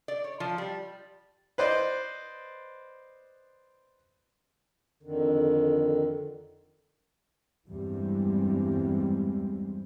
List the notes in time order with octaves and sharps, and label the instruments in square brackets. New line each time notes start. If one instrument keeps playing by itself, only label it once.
[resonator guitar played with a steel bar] D5
C#5
F3
G3
[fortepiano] B4 C5 D5 D#5
[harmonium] F2 D3 D#3
[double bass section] E2 G2 E3 G3 G#3 C4